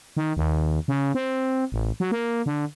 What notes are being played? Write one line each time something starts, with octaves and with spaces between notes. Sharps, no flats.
D#3
D#2
C#3
C4
A1
F#3
A#3
D3